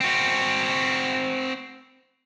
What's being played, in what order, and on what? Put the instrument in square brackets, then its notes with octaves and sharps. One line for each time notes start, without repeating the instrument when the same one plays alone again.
[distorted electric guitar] C4 F#4